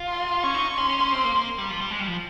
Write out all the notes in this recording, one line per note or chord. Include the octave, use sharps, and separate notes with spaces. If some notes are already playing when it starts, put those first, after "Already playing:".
Already playing: F4
C6
C#4 C#6
D#4
C#4 C6
C#4
C#4
C4
A#3
A#3
G3
F3
G3
G#3
G3
F3